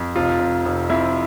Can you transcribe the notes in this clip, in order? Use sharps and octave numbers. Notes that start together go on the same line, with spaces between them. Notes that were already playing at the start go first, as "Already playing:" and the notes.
Already playing: F2
F1 F4
F1
F1
F2 E4